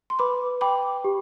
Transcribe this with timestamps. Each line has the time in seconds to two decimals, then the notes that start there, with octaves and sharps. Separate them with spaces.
0.10 C6
0.19 B4 B5 D6
0.61 G5 B5 D6
1.04 G4